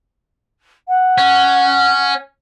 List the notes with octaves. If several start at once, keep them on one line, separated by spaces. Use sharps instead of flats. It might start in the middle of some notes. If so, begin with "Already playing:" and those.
F#5
C#4